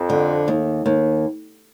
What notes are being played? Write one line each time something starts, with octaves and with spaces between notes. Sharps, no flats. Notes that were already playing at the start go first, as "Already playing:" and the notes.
Already playing: F2
D3
D#2
D#2